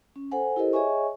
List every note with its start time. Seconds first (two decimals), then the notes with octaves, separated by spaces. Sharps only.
0.16 C#4
0.31 A4 C5 F#5 G#5
0.56 E4 G4 A4 A#4 C5 D#5
0.73 G#4 C#5 D#5 E5 G#5 C#6